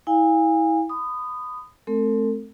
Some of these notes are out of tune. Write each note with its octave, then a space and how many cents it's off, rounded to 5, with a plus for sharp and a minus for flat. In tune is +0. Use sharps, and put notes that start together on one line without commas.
E4 -25 F5 +20 G#5 -30
B5 +25 D#6 -10
A3 -35 C4 +0 A4 +45